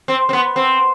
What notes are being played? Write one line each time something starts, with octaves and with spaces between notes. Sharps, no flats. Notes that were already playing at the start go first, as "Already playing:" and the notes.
C4
C4
B3
C4